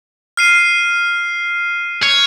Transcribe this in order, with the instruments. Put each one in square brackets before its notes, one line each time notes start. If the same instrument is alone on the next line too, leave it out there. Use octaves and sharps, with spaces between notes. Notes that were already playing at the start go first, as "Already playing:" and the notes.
[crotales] F6 C7 D#7
[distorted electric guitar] C#5